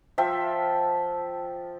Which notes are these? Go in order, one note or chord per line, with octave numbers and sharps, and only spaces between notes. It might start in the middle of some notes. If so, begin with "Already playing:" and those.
F3 E5 G5